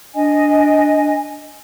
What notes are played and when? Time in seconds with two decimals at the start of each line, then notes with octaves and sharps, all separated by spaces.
0.15 D4 D#5 G#5